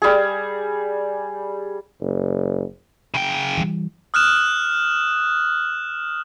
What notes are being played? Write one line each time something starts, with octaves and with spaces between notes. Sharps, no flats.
G3 G#4
F#1
C#3 G5
E3 G3
D#6 F6 F#6 E7